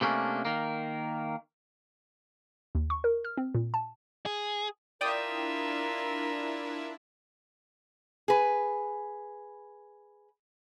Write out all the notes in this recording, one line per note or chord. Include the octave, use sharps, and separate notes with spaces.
C3 A3 A#3 C#4 D4
D#3 A#3
D#2
C#6
A#4
F6
C4
A#2
A5
G#4
D4 E4 F4 A#4 D5 E5 G5 D#6
G#4 B4